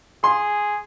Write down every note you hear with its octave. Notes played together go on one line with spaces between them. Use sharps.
G#4 C6